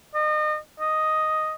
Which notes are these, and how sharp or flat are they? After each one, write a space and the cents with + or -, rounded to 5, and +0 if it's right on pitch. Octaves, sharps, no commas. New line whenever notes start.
D#5 -35
D#5 +0